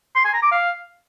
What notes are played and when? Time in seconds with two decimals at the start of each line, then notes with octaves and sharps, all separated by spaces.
0.16 C6
0.25 G#5
0.34 A#5
0.43 D6
0.52 F5